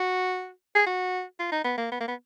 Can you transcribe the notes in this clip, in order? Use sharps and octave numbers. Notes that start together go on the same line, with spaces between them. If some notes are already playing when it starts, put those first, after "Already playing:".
Already playing: F#4
G#4
F#4
F4
D#4
B3
A#3
B3
A#3
B3